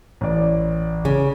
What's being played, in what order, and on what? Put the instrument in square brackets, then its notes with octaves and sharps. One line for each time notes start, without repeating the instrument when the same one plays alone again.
[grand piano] A1 D5
[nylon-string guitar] C#3